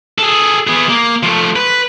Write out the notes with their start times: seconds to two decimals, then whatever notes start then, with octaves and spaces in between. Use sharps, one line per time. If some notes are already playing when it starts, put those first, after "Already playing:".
0.18 G#4 A4
0.67 B3 G#4
0.89 A#3
1.23 F3 A3
1.56 B4